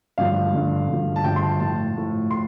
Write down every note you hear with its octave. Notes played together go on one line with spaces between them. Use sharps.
G2 D3 F3 F5
G2 D3 F3
G2 D3 F3
A5
G2 D3 F3 G5
C6
A5
A2 F3 A5
A2 F3
A2 C6